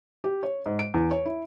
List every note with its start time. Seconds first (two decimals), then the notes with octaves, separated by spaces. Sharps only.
0.24 G4
0.43 C#5
0.66 G#2
0.79 D7
0.94 E2
1.11 C#5
1.26 E4